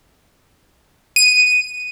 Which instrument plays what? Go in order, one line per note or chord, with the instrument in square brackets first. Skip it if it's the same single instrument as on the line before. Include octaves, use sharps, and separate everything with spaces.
[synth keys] D#7